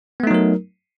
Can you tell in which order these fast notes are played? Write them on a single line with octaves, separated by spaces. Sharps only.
B3 A3 D#4 F#3 A#4